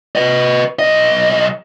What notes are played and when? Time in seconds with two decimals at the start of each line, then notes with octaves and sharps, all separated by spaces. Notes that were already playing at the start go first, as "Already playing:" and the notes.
0.15 B4 D#5
0.79 B1 D#5